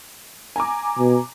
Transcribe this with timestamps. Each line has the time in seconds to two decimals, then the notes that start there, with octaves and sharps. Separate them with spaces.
0.56 G#5 A#5 D6
0.98 B2